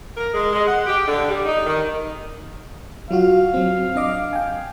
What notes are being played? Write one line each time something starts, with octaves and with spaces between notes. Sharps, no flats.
A#4
G#3
G#3
F#5
G4
D3
G3
D#4
D#3
F#3 F4 F#4 F5
F#3 C4
D4 D#5 D6
G5 G#5